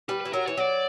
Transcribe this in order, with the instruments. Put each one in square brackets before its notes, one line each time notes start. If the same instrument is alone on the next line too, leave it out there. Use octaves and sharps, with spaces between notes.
[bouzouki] G3 [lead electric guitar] B4
[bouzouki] E3 [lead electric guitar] B4
[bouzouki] F#3 [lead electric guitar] A#4
[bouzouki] E3 [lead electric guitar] C#5
[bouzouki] F#3 [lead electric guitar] D5